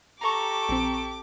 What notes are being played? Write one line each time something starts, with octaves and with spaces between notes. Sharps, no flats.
G4 A4 A#5 C#6 D6
A#1 C4